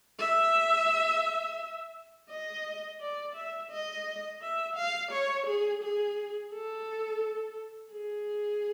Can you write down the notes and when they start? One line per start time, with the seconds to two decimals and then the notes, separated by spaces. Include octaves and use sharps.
0.19 E5
2.30 D#5
3.01 D5
3.36 E5
3.71 D#5
4.42 E5
4.76 F5
5.12 C#5
5.47 G#4
5.83 G#4
6.53 A4
7.93 G#4